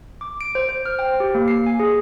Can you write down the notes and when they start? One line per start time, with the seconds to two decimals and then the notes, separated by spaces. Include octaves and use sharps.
0.21 D6
0.41 D7
0.55 C5
0.69 C5
0.86 F6
0.99 G5
1.20 G4
1.35 A#3
1.48 C7
1.66 G#5
1.80 G#4